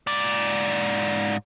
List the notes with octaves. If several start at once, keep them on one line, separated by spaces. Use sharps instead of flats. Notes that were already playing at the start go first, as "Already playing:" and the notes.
G#2 D5